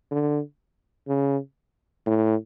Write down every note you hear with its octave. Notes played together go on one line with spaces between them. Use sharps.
D3
C#3
A2